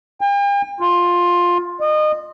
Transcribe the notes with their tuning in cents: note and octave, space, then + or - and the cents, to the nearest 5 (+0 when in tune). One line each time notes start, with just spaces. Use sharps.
G5 +45
F4 +10
D#5 -30